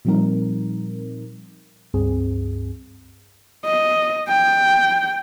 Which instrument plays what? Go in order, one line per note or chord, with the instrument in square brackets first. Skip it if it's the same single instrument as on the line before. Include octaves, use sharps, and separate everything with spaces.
[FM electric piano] A#2 F3 G3 C4 D#4 A#4
C#2 G2 C4 G#4
[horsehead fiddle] D#5
G5